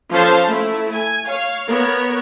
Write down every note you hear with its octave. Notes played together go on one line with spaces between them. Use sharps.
F3 C#4 A4 C5 F5 A5
A3 E4
G#5
C#5 F5
B3 A#4 C#5